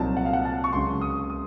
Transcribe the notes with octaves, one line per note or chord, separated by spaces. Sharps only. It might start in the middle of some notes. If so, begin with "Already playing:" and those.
Already playing: C2 A#2 F#3 C4 D#4 A5
F#5
F5
F#5
A5
C#6
C#2 C#3 F#3 C6
D#6
D#6